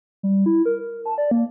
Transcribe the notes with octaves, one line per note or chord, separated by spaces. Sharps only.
G3
E4
A#4
A#4
A5
D5
A#3